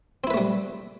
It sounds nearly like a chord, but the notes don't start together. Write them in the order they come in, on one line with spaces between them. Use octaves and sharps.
C4 E4 B4 A3 G3